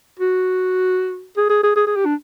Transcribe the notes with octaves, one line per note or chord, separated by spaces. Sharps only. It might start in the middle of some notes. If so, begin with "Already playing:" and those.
F#4
G#4
G#4
G#4
G#4
G#4
G4
D4